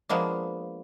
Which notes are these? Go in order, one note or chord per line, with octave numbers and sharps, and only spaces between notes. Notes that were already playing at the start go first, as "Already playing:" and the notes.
F3 G#3 A#3 B3 D4